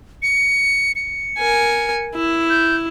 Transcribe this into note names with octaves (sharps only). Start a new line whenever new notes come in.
C#7
C#7
A#4 G#5
E4
G6